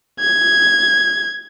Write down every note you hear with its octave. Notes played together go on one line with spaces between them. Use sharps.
G#6